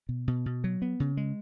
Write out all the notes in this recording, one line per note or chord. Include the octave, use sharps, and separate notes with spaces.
B2
B2
B2
F#3
B3
C#3
G#3